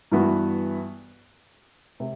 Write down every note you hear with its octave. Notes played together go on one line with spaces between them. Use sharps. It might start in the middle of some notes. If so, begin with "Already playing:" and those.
G2 E3 B3 F#4 B4
C3